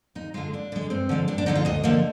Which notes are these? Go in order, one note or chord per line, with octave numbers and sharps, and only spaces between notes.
D#2 D#4
D3 G#3 F4
D#2 D4
D3 G#3
G2 C4
D3 F3 G#3
G2 D4
D4
D3 F3 G#3 D#4
F4
D2 D#5
D3 F3 A#3